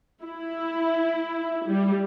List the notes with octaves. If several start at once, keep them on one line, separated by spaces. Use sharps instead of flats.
E4
G3